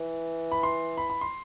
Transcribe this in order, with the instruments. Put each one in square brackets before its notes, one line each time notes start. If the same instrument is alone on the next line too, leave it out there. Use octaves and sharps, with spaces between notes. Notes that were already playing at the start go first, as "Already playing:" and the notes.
Already playing: [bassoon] E3
[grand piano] B5
C6
B5
B5
C6